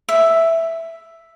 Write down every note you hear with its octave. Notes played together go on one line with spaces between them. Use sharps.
E5